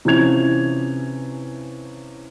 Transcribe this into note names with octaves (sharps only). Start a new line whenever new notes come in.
C3 E3 F3 C#4 G#6 F7